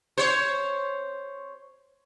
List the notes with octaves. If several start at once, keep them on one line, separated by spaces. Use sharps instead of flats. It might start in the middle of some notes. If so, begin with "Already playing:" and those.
C5 C#5